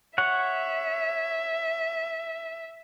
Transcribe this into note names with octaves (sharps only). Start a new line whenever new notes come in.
C#5 E5 F#5